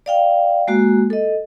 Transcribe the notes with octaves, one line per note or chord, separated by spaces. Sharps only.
D5 F5 G5
G#3 A#3 F#4
A4 D#5